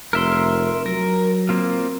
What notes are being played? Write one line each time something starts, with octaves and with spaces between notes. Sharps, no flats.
F1 A#4 E5 C6
F#3 A#4
A#3 C4 F4